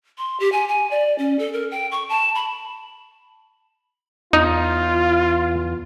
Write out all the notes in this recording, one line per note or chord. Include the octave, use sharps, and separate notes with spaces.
C6
G4
G#5
G#5
D5
C#4
A4
A#4
G5
C#6
A5
B5
E2 D#4 F4